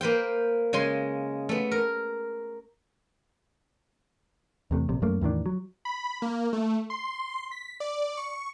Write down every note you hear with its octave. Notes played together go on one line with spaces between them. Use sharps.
A#3 B4 C5 G5
C#3 G#3 G#5 C6
A3 B3
A#4
E2 C3 A3
A#1 C3
F#2 A3 A#3
E2 A2 D#3 D4
F#3
B5
A#3
A3
C6
B6
D5
C#6